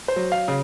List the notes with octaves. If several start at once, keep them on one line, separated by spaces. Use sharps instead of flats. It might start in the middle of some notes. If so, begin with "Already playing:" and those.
C5
F#3
F5
C#3